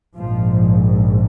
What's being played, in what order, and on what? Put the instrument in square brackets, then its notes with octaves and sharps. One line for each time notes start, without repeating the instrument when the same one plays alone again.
[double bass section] A#1 G#2 F3